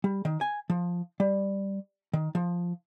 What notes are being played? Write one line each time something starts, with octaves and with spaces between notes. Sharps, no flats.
G3
D#3
G#5
F3
G3
D#3
F3